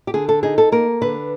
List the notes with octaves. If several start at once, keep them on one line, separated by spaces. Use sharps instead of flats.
G4
D3 G#4
A4
D#4 G#4
A4
A#3 A#4
D3 B4